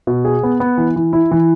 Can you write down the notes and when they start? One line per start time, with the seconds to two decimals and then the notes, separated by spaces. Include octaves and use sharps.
0.07 B2
0.25 G#4
0.43 B3
0.60 B3
0.78 E3
0.96 E3
1.13 E4
1.31 E3